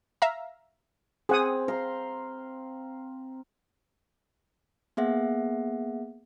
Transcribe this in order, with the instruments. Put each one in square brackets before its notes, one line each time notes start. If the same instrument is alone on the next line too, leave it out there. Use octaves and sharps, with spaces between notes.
[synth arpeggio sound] E5 F5 A#5
[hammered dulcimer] C4 [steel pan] G#4 F#5 D#6
[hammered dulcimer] F5 A#5 C6
[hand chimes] A#3 B3 G#4 E5 F#5